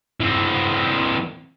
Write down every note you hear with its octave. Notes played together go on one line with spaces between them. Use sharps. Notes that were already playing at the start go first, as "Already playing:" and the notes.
E3 C4